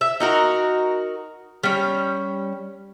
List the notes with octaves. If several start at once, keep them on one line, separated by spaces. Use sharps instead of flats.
E5
D#4 F#4 A#4
G3 C#4